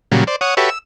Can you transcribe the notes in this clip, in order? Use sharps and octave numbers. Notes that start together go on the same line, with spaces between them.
A#2 C#3 F#3 G3
C5 D5
C#5 F#5 D#6
F#4 G4 A4 B4 C#5 E5
E6